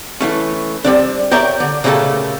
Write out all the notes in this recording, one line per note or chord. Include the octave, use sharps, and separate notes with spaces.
E3 A3 C#4
G3 C4 D4
G4 A#4 C#5 D5 E5 G5
D3
A#2 C#3 A3 A#3 G4 A4